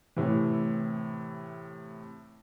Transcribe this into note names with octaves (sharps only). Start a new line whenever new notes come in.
A2 C3 E3